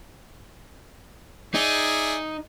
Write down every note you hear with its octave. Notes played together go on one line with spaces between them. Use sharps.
D#4 G#4 D5 E5